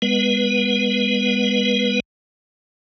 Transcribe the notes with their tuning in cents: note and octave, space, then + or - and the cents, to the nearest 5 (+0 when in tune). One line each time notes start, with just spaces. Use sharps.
G#3 -30 B3 +0 B4 -20